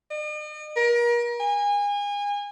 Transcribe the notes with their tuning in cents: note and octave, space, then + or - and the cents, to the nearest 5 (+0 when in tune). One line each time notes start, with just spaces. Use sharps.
D#5 -45
A#4 +35
G#5 -30